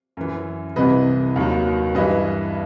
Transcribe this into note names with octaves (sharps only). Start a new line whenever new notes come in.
F#2 E3
C2 C3 E3 B4 D#5
D#2 D#3 F#3
G2 E3 B4 D#5